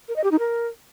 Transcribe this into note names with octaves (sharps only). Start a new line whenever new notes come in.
A#4
D#5
G4
D#4
A#4